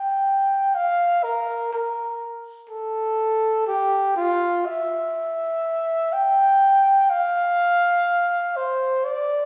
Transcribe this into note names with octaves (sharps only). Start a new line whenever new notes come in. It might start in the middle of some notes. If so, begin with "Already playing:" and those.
Already playing: G5
F5
A#4
A#4
A4
G4
F4
E5
G5
F5
C5
D5